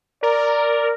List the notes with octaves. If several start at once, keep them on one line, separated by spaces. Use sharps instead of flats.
A#4 D5